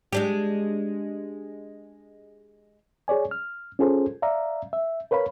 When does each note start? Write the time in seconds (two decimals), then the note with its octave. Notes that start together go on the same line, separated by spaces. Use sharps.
0.12 G#3 D4 G4
3.08 G#4 C#5 D5 G#5
3.31 F6
3.79 C#4 F4 G#4 A4 C5
4.22 D5 E5 F5 A#5
4.73 E5
5.11 A#4 B4 C#5 F5 B5